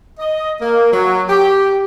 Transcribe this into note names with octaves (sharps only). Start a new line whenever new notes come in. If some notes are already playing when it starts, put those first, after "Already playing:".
D#5
A#3
F#3
G4